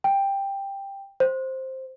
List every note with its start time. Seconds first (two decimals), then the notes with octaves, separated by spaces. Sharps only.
0.04 G5
1.20 C5